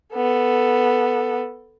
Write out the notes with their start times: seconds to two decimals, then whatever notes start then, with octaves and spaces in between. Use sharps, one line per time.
0.14 B3 A4